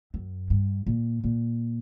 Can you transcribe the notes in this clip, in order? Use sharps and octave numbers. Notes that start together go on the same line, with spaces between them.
F#2
G2
A#2
A#2